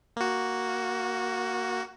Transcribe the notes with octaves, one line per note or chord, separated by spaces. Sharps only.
A#3 F#4